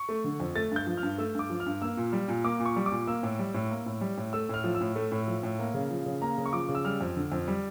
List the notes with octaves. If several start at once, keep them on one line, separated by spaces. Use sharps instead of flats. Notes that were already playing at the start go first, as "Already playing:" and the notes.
Already playing: C#6
A3
D3
F2
A3 A6
G2 G6
F3
F6
G2
A3 E6
G2 D6
F3
F6
G2
A#3 E6
A#2
G3
A#2
A#3 D6
A#2
C#6
G3
D6
A#2
A#3 E6
A2
G3
A2
A#3
A2
G3
A2
A3 E6
A2 F6
F3
E6
A2
A3
A2
F3
A2
A#3
C#3
F3
C#3
A#3 A#5
C#3
C#6
F3 D6
C#3
E6
G3 F6
F2
D3
F2
G3